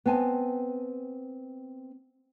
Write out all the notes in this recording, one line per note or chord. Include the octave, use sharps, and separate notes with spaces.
B3 C4 G#5 A5